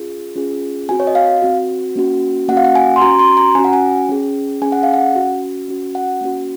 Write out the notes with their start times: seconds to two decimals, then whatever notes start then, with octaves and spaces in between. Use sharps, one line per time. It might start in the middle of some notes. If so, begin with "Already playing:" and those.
Already playing: C#4 F4 G#4
0.35 C#4 F4 G#4
0.89 C4 F#4 G#5
1.00 C#5
1.07 D#5
1.15 F5
1.42 C4 F#4
1.96 A#3 C#4 F#4
2.48 A#3 C#4 F#4 F#5
2.57 F5
2.64 F#5
2.75 G#5
2.96 C6
3.01 C#4 F#4 A#5
3.19 C6
3.37 A#5
3.55 C#4 F#4 G#5
3.64 F#5
3.73 G#5
4.09 C#4 G#4
4.62 C#4 G#4 G#5
4.72 F#5
4.83 F5
4.94 F#5
5.15 C#4 F#4
5.68 C#4 F#4
5.95 F#5
6.21 A#3 C#4 F#4